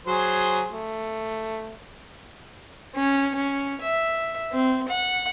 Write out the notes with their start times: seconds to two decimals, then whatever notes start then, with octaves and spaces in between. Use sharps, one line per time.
0.07 F#3 G#4 C5
0.72 A3
2.95 C#4
3.35 C#4
3.81 E5
4.52 C4
4.88 F#5